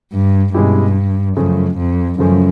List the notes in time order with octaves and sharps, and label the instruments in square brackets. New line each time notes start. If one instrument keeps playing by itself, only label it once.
[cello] G2
[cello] G2 [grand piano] B2 G#3 C#4 E4 G4
[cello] F#2 [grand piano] C#3 F3 A3 C#4
[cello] F2
[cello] F#2 [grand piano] C#3 F3 A3 C#4